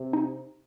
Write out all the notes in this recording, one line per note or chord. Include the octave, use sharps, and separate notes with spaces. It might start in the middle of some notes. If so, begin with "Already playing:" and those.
Already playing: C3
D#4